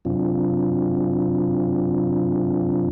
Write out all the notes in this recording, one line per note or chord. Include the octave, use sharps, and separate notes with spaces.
F#2 C3 F#3 C4 D4 F4